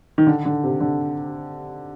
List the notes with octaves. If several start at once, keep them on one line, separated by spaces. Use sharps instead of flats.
D#3
D3
D3
C3
D3